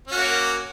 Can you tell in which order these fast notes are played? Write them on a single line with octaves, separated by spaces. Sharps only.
C#4 F#4 A#3